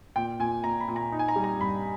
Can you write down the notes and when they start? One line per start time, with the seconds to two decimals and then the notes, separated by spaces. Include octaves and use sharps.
0.16 A#2 G5
0.39 A#2 G#5
0.64 A#2 A#5
0.80 B5
0.88 A#2
0.96 A#5
1.12 D#4
1.19 G#5
1.28 A#5
1.36 G3
1.44 A#5
1.59 G2 B5